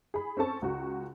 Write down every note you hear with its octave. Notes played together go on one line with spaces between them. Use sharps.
G#4 B5
C4 C#4 A4 A5 C#6
C#2 F#4